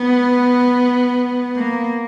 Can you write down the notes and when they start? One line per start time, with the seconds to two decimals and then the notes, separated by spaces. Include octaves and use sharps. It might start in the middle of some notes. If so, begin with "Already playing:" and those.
Already playing: B3
1.56 A#3